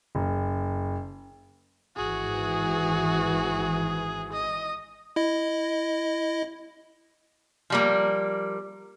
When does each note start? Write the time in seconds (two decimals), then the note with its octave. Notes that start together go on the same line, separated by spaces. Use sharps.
0.15 F#1
1.97 G#1 E3 F#4 G#4
4.33 D#5
5.16 E4 D#5
7.70 F3 G3 A#3